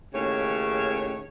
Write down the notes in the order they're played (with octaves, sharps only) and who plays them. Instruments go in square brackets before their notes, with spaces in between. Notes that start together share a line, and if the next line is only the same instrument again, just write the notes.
[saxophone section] D#2 A2 C#3 C#4 C#5